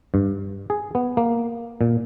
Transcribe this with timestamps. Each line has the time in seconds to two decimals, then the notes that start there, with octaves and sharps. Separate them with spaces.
0.14 G2
0.70 G#4
0.95 B3
1.17 A#3
1.81 A#2